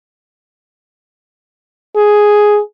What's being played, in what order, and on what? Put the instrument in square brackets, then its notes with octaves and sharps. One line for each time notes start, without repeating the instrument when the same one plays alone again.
[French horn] G#4